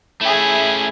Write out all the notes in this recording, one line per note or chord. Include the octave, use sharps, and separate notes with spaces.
A3 C#4 E4 G#4